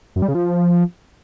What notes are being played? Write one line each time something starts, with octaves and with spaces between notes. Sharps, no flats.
F#2
G3
C#3
F3